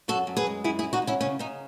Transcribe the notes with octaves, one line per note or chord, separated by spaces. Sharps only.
F#2 F#4 A4
F#2
G#4 B4
G#3
F#2 E4 G#4
E4 G#4
G#3
D#4 F#4
G#3
C#4 E4
C#3 C#4
C#3 D#4